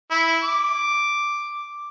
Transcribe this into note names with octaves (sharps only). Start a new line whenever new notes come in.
E4
D6